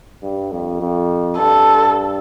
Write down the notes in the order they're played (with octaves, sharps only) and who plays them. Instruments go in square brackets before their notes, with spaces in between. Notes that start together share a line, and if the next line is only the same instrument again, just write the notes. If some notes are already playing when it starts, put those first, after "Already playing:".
[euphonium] G2
F2
F2
[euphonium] G2 [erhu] A4